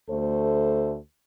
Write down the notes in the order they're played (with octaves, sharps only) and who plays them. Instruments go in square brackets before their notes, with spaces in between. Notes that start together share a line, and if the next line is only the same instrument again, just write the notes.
[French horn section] D2 A3 A4 C5